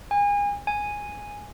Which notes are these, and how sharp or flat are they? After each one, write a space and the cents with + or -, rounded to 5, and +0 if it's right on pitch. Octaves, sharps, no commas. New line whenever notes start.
G#5 -30
G#5 -5